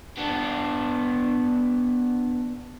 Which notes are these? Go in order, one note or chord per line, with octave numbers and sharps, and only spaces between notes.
B3 D4